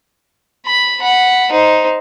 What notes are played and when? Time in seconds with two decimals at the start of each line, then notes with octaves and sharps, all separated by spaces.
0.66 B5
1.02 F#5 B5
1.52 D#4 C5